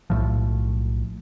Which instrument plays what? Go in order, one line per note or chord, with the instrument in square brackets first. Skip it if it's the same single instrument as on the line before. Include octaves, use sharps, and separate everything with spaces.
[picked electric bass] B1 A2 F3